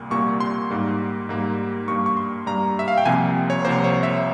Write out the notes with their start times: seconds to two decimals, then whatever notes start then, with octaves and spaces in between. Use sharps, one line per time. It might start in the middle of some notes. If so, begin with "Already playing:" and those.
Already playing: C2 A#2 G3 A#3
0.10 C2 A#2 G3 A#3 C#6
0.40 C6
0.70 G#2 G3 A#3
1.29 G#2 G3 A#3
1.88 G2 G3 A#3 C#6
2.06 C#6
2.17 C6
2.46 G2 G3 A#3 A#5
2.79 E5
2.88 F5
2.98 G5
3.05 C2 C3 F3 A#3 G#5
3.50 C#5
3.64 C2 C3 F3 A#3 C5
3.84 C#5
4.03 E5